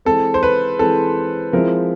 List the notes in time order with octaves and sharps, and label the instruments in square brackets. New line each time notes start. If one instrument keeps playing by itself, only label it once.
[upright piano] E3 G#3 C4 [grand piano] A4
[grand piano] C5
B4
[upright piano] E3 G#3 C4 [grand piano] A4
[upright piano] F3 G#3 C4 E4 [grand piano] A#4